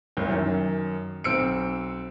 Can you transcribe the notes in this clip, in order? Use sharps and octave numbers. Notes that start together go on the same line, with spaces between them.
F#1 C2
F#2 D#3
B1 C4 E6 C#7 D7